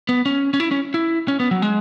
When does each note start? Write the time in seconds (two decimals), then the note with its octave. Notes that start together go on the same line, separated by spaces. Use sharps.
0.09 B3
0.26 C#4
0.54 C#4
0.60 E4
0.71 C#4
0.94 E4
1.28 C#4
1.40 B3
1.51 F#3
1.62 G#3